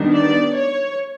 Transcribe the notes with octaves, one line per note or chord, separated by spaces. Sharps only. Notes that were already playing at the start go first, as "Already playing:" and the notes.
Already playing: D#3 G3 B3 D4
D5
C#5